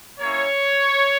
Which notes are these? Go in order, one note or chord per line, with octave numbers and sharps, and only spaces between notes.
A#3 C#4 E4 C#5